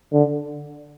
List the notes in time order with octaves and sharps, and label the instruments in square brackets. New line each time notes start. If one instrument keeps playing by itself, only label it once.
[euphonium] D3